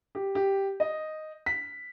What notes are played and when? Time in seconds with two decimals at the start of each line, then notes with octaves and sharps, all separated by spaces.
0.15 G4
0.35 G4
0.80 D#5
1.46 B6